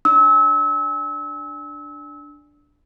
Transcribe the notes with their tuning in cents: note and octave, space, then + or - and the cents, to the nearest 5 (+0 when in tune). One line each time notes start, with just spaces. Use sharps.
D4 +0 E6 -30